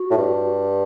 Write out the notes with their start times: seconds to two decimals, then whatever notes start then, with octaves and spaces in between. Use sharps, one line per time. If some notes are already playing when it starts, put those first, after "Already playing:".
Already playing: F#4
0.10 A2
0.18 G2